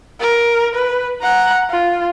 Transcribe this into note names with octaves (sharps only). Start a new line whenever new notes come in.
A#4
B4
F#5 A#5
F4